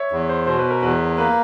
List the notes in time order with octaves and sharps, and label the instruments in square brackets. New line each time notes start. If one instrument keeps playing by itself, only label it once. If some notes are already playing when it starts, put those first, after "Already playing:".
Already playing: [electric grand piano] C#5 E5
[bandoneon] E2
[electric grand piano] C5
[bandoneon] B2 [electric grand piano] C5
[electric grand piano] B4
A#4
[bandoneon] E2 [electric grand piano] B4
[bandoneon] A#3 [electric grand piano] B4